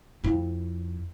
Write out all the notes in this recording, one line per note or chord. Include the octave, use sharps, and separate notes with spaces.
F2 E4